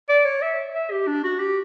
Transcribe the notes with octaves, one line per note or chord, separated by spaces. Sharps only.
D5
C#5
E5
E5
G4
D4
F#4
G4